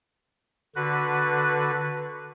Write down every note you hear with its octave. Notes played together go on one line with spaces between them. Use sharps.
D3 F#4 B4